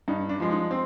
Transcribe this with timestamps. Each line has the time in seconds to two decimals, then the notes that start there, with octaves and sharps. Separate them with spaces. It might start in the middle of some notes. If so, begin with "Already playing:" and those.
0.08 G2 D#4
0.29 D4
0.40 F3 G#3
0.51 D#4
0.71 C4